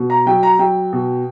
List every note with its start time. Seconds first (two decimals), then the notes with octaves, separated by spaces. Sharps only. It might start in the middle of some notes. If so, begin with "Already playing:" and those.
Already playing: B2
0.10 A#5
0.26 F#3 G5
0.43 A#5
0.59 F#3 G5
0.93 B2